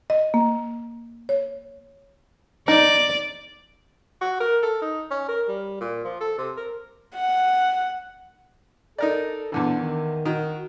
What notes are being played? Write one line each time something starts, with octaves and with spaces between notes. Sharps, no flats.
D#5
A#3
C#5
D#4 D5
F#4
A#4
A4
D#4
C#4
A#4
G3
A#2
F3
A4
C3
A#4
F#5
D#4 A4 A#4 D5
E2 D3 E3 D4
D#3
D#3 F#4